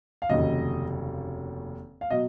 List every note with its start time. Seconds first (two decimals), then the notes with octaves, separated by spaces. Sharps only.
0.22 F5
0.29 F1 D#2 C#3 F#3 D#5
2.01 F5
2.11 B2 F#3 D#5